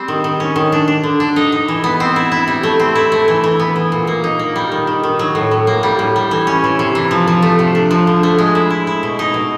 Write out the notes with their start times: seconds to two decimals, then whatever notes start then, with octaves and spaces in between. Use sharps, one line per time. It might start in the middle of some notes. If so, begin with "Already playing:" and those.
Already playing: G3 C4
0.08 D#3
0.24 D#3
0.40 C#4
0.56 D#3
0.72 D4
0.88 D4
1.03 D3
1.20 D4
1.36 D#4
1.52 D#4
1.68 E3
1.84 B3
2.00 C4
2.16 E4
2.32 E4
2.48 G3
2.63 A3
2.80 C4
2.95 E4
3.12 A3
3.28 E3
3.44 E3
3.60 B3
3.76 E3
3.92 A#2
4.07 A#3
4.24 D#4
4.39 A#3
4.56 G3
4.72 D#3
4.87 D#3
5.03 D#3
5.19 F#3
5.35 A2
5.51 A2
5.67 A#3
5.83 G3
5.99 A2
6.16 G3
6.31 E3
6.47 C#4
6.64 E3
6.79 C3
6.95 E3
7.11 F3
7.27 F3
7.42 A3
7.59 C3
7.75 D4
7.91 F3
8.07 D3
8.23 A3
8.38 G#3
8.55 E4
8.70 E4
8.87 E4
9.03 B2
9.19 D#4
9.34 B2